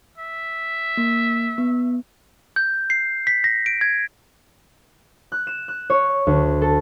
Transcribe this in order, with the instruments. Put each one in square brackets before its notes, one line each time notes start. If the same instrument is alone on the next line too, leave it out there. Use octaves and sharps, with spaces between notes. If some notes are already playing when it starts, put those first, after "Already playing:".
[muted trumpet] E5
[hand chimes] A#3
B3
[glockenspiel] G6
C7
B6
A#6
D7
G#6
[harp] F#6
E7
F#6
C#5
D2
A4